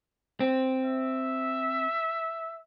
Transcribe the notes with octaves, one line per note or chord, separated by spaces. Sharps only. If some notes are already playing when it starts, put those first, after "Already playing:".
C4
E5